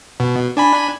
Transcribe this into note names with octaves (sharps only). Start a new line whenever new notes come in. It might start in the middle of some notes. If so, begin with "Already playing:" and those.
B2
D4 G#5 B5